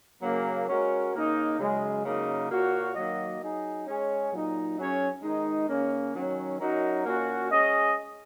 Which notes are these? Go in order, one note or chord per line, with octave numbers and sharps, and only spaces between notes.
C#3 F#3 A#3
G#3 C#4 F#4 A#4 C#5
C#3 A#3 D#4
F#2 C#3 G#3
F#2 C#3 A#3 D#4 A#4
A#2 A#3 F#4 C#5
D#3 F#3 A#3 F#4 D#5
F#3 D#4 G#4
G#3 C#4 G#4 C#5
A#2 F#3 D#4
F#2 F#3 C#4 G#4 C#5
D#3 G#3 D#4
C#3 A#3 C#4
D#3 F#3 C#4
F#2 F#3 D#4 F#4 A#4
A#2 A#3 C#4 F#4
G#3 C#4 G#4 D#5